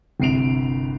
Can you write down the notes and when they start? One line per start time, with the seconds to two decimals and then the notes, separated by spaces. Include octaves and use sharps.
0.20 G1 C2 C7 D7 F7